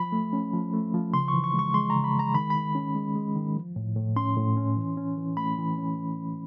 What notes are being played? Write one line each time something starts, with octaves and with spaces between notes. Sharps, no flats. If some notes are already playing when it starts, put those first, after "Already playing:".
Already playing: F3 B5
A3
C#4
F3
A3
F3
C#3 C6
C#6
E3
C#6
G#3
C#6
G#3 C6
C#3 A#5
B5
G#3 A#5
D#3 B5
D#3 B5
C#4
G#3
G#3
D#3
F3
A2
A2
C#4 C6
A2
C#4
E3
C#4
E3
A3 B5
E3
C#4